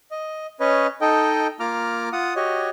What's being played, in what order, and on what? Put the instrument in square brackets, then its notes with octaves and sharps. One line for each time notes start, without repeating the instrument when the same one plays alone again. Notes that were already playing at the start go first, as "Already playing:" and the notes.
[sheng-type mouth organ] D#5
C#4 B4 C#5 D#5
D#4 A4 D#5 G5
A#3 F4 A#5 D6 F6
F4 F#5 D#6
F#4 G4 C#5 D#5